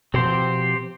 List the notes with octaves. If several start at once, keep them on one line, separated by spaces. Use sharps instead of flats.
B2 F3 C4 G4 C5